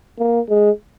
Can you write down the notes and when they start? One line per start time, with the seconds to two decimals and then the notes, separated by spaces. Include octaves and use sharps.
0.19 A#3
0.49 G#3